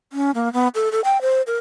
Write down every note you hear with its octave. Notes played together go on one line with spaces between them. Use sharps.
C#4
A#3
B3
A4
A4
G5
C5
A#4